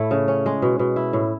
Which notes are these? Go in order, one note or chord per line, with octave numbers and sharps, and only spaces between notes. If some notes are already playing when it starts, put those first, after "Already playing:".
Already playing: A2 A3 E4
C#3
C#4
G#3
B2
B2
E4
A2